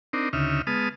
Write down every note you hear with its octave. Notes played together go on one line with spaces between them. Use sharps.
C4 D4 D#4 A#4
D2 C#3 D#4 E5 F6
G#3 B3 A5 D#6 F6